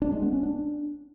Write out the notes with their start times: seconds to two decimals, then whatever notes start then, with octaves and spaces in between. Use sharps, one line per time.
0.02 D4
0.12 G#3
0.22 B3
0.33 C#4
0.43 D4